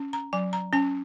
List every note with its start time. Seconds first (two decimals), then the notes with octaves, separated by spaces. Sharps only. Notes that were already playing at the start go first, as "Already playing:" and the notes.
Already playing: C#4
0.13 A#5
0.33 F#3 G#5
0.53 A#5
0.73 C#4 G#5